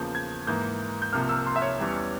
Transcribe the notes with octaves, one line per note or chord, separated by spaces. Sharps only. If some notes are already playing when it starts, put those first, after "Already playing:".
Already playing: E2 C#3 F3 A#3 G6
G#6
G#2 E3 A#3 G6
G6
C2 C3 F3 A#3 F6
E6
C6
E5
C#5
E2 E3 G3 C#4